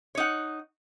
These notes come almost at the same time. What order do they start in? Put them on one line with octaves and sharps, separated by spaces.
C#5 D#4 F#5